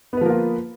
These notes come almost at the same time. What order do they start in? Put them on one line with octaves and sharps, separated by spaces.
B3 B4 F3 A#3 F4